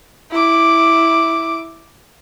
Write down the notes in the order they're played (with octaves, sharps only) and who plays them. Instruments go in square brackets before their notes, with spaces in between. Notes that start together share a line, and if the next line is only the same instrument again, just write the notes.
[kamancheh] E4 D6